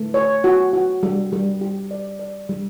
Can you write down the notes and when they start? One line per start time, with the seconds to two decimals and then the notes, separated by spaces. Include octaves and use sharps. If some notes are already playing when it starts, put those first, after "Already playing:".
Already playing: A3
0.14 C#5
0.44 F#4
0.73 F#4
1.03 G3
1.33 G3
1.61 G4
1.91 D5
2.19 D5
2.49 G3